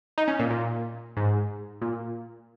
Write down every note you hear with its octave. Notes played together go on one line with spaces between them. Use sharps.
D#4
C#4
A#2
A#2
G#2
A#2